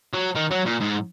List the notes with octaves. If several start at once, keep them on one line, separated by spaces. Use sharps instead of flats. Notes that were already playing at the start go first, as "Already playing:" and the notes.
F#3
D#3
F#3
A#2
G#2